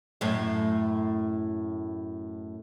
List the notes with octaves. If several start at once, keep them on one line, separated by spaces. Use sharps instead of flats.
F#2 A2